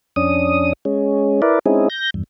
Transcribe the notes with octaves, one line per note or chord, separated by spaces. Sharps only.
F2 C#4 D4 D#6
G#3 C#4
E4 A#4 B4 D5
G#3 C4 C#4 D#4 E4 G#4
G6 A#6
E2 G2